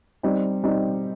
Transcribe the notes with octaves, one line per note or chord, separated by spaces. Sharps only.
G3 C4 D#4
G3 C4 D#4